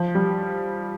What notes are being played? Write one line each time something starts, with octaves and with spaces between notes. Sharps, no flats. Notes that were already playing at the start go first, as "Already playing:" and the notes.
Already playing: F3
G3